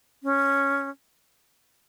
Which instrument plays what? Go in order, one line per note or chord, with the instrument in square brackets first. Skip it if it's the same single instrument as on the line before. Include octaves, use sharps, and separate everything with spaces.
[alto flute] C#4